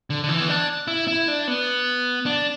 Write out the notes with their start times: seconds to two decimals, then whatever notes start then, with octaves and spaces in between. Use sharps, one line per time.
0.10 D3
0.24 D3
0.29 E3
0.40 B3
0.49 D4
0.88 E4
1.08 E4
1.28 D4
1.48 B3
2.26 D4